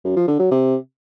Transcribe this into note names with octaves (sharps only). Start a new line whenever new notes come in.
F#2
F3
D3
F#3
C3